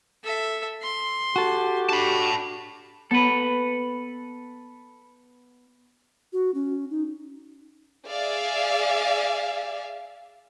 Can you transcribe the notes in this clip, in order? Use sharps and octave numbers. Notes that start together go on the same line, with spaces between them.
A4 E5
C6
F#4 G4 A4
D4 A5 B5
B3 A4 B4
F#4
C#4
D#4
G#4 D5 E5 F5